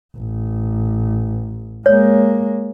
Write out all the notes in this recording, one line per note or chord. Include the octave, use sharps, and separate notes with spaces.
A1
G#3 A#3 C#5